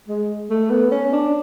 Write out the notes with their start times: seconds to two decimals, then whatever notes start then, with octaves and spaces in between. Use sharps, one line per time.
0.08 G#3
0.50 A3
0.70 B3
0.91 C#4
1.13 D4